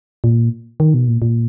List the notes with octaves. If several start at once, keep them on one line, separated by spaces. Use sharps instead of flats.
A#2
D#3
B2
A#2
A#2